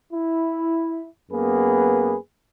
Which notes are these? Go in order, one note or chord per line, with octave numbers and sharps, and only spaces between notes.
E4
F#2 A#3 B3 G#4 B4